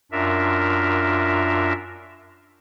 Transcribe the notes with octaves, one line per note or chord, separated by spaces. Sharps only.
F#2 D4 F4 A#4 E5